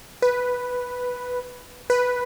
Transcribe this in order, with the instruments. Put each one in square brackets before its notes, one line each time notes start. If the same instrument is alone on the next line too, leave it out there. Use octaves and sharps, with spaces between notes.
[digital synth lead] B4
B4